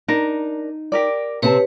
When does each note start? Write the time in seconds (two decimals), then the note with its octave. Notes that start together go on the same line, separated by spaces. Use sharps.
0.08 D4 D#4 A#4
0.92 G4 A#4 D5
1.42 C3 C4 G4 B4 C#5 A5